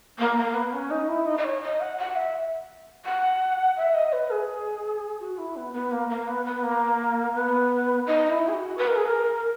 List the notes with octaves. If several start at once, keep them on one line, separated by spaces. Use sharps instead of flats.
A#3
A#3
B3
C#4
D#4
E4
D#4
D#5
C#5
D#5
F#5
F#5
E5
F#5
E5
D#5
B4
G#4
F#4
E4
B3
B3
A#3
A#3
B3
B3
A#3
B3
D#4
E4
G#4
F#4
B4
A#4
G#4
A#4